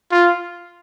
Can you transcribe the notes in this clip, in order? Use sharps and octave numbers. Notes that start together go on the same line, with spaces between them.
F4